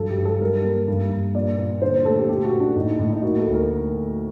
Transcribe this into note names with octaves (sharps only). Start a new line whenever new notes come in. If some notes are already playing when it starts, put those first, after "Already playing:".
Already playing: G2 F#3 A4
G4
G2
A4
G3 A#4
A#3
G2
G2
A#2 D5
A#2
D3 C5
A3 A4
G4
A#2 G4
F#4
A#2
D4
A2 D#4
A2
D#4
A#3 F#4
A4
D2
A#4